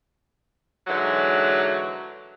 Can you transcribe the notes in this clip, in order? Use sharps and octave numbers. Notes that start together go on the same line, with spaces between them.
G#2 D3 E3 F#3